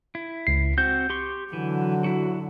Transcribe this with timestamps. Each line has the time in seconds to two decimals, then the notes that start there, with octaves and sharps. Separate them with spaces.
0.15 E4
0.47 C#2 C7
0.78 C4 F#4 G6
1.10 G4 C6 C#6
1.53 D3 E3 F#3
2.04 E4 F#4